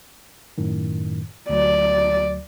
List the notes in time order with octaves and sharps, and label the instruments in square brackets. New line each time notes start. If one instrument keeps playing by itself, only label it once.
[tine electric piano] F#2 A2 D#3
[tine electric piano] D2 F#3 [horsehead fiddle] D5